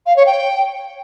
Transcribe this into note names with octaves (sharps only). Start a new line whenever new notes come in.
F5
C#5
G5